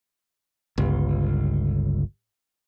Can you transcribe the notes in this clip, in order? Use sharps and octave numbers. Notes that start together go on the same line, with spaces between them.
G1 C#2